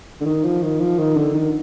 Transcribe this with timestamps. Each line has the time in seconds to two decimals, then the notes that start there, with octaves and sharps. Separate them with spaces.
0.21 D3
0.26 D#3
0.44 F3
0.63 D#3
0.80 F3
0.99 D#3
1.17 D3
1.35 D#3